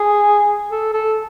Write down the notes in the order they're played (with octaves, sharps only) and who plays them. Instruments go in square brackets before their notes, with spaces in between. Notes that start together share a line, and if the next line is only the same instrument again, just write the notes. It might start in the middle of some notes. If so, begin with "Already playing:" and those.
Already playing: [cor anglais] G#4
A4
A4